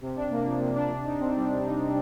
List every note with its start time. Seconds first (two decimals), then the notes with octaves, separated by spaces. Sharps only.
0.01 C3
0.16 D4
0.31 A#3
0.46 F3
0.61 C3
0.75 D4
0.90 C3
1.05 D#4
1.20 C4
1.35 G3
1.50 C3
1.66 D#4